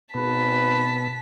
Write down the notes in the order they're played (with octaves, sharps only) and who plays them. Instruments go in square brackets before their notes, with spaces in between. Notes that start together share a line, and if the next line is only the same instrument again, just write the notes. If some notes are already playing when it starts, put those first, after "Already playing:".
[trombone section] G#1 B4 [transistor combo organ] B2 [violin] A5 B6